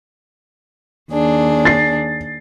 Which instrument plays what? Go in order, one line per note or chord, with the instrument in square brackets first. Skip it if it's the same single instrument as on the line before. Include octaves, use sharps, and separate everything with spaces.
[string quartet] D#2 D4 G#4
[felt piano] A6 C7